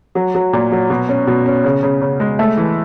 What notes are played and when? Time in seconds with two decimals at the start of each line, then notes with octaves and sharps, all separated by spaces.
0.15 F#3
0.35 F#3
0.53 A#2
0.72 F#3
0.90 B2
1.09 C#4
1.27 B2
1.46 C#4
1.64 C#3
1.83 C#3
2.02 C#3
2.20 G#3
2.39 A3
2.57 E3